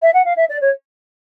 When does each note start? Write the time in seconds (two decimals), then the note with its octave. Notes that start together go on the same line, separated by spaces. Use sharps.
0.02 E5
0.14 F#5
0.25 F5
0.37 E5
0.49 D5
0.61 C#5